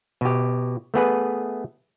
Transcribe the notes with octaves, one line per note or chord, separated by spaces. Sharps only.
B2 G4
A3 B3 G#4 B4